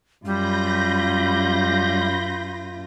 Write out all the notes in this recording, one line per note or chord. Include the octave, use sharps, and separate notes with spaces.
F#2 G3 F4 B5 G6 A#6